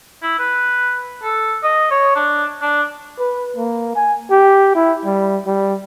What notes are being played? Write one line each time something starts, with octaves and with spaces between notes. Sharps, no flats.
E4
B4
A4
D#5
C#5
D4
D4
B4
A#3
G#5
G4
E4
G3
G3